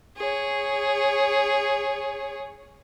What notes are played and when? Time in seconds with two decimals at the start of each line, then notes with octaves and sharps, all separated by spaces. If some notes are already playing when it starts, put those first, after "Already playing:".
0.17 G#4 C#5